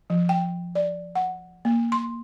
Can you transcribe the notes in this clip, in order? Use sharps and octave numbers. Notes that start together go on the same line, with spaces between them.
F3
G5
D5
F#5
A#3
C6